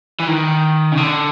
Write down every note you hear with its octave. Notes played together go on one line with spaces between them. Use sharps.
E3
D#3
C#3
D3